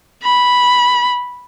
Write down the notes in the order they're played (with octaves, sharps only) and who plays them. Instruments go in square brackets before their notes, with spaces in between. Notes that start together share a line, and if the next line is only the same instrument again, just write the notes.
[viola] B5